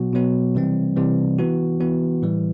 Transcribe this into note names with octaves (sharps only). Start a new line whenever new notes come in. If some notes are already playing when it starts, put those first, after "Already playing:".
Already playing: B2 F#3 B3 F#4
B2 F#3 B3 F#4
C3 E3 G3 C4
C3 E3 G3 C4
E3 B3 F#4
E3 B3 F#4
A2 E3 G3